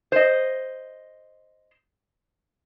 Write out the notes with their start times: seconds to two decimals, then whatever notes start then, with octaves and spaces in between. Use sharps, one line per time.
0.12 C5 D#5